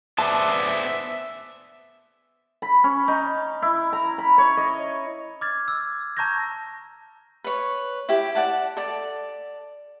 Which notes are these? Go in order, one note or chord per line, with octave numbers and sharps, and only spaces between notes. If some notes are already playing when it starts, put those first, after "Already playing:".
B3 G#4 C5 D5 E5 A5
B5
C#4
D#4
E4
A#5
B5
C#5
D#5
D6 F6 G#6 A6
E6
A5 A#5 C#6 G6 G#6 A#6
B4 C#5
E4 G4
D5 F#5 A5
A4 D5